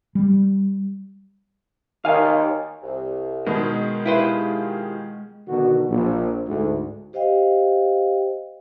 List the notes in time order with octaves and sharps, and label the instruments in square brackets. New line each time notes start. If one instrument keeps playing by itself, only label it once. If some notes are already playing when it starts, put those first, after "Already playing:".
[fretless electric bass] G3
[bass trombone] D#3 [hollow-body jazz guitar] F5 G#5
[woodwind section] C2
[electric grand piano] B2 D#3 B3 [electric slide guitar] G#3
[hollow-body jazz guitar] E4 B4 C5 [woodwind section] F4 G4 G#4
[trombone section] B2 D3 D#3 F#4
A#1
D2 G#2
[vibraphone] G4 C5 D#5 F5 G5